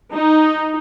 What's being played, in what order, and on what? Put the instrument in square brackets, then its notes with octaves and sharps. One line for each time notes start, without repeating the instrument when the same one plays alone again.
[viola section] D#4